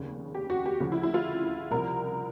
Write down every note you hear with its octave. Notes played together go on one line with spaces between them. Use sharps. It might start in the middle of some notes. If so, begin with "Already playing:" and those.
Already playing: F1 D#2 C#3
G4
F#4
G4
D2 C#3 F3
E4
E4
F4
C2 C3 F3 A#4